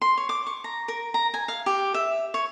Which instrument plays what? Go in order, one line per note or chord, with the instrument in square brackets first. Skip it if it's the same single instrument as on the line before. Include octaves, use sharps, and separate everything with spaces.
[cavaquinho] C6
C#5
D6
C#6
A#5
A#4
A#5
G#5
F5
G4
E5
C#5